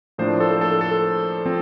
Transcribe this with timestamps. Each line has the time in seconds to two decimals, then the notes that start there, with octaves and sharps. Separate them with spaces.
0.18 A2 F3 A#3 D4 C5
0.40 A4
0.61 A4
0.81 A4
1.45 F3 C4